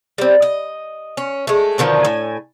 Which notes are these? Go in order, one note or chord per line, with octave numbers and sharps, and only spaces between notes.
G3 C4
D#5
C#4
G#3 A3
B2 D3 D#3 F3
A2 G#5